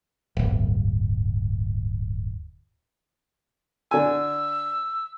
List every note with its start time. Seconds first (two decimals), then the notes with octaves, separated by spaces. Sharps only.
0.37 D1 G1
3.91 D3 G#5 E6